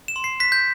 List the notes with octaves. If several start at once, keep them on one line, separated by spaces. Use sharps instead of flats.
E7
C6
C7
F#6 B6
G6